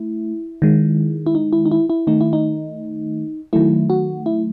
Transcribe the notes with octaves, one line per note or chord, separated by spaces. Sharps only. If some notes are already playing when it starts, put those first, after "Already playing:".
Already playing: A3 E4
D#3 G#3
E4
D#4
E4
D#4
E4
E4
D#3 A3 D#4
E4
D#4
D#3 F#3 A3 E4
F#4
E4